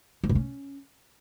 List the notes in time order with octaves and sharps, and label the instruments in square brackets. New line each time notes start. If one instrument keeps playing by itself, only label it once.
[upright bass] F3
C3
C#4